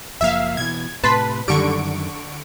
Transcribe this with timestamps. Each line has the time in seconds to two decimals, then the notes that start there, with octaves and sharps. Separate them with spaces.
0.21 F#1 F3 A#3 E5 F5
0.57 B2 E3 G#6
1.04 A2 C3 B4 A5 C6 B6
1.48 F#2 D3 D#3 G3 C#6 D7